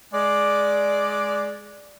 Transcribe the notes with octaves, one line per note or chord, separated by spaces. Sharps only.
G#3 D5